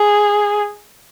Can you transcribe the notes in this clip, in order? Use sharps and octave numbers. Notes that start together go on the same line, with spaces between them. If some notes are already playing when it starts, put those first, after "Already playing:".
Already playing: G#4